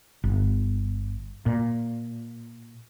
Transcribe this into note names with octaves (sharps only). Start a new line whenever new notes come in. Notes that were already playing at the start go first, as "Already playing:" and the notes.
G1
A#2